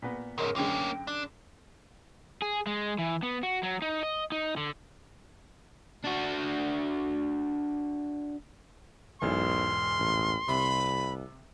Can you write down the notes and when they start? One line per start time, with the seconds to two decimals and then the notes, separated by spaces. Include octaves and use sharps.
0.02 A#2 B3
0.38 C#2 G#2 C#4 G#4 A#4 D#5
0.56 F#2 D3 G#3 A#3 C#4 G5
1.07 D4
2.42 G#4
2.67 G#3
2.98 E3
3.23 B3
3.43 F#4
3.63 F#3
3.82 D#4
4.03 D#5
4.32 D#4
4.57 D3
6.05 D4 F#4
9.22 E1 B1 G#2 E3 C6 F6
9.99 A1
10.48 C2 C3 B5